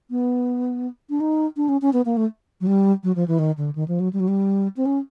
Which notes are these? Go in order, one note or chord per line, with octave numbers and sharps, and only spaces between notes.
B3
D4
D#4
D4
C#4
C#4
B3
A#3
A3
F#3
G3
F#3
F3
E3
D#3
D3
D#3
F3
F#3
G3
F#3
G3
C4
C#4